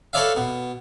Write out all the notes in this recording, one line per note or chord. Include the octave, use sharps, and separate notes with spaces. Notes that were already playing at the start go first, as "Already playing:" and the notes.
A4 B4 C#5 D5 E5 F5
B2